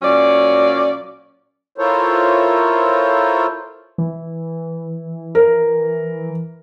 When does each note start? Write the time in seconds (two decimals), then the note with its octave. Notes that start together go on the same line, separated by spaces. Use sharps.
0.03 A#2 F#3 C#4 D5
1.78 E4 F4 A4 A#4 C5 C#5
3.98 E3
5.35 A#4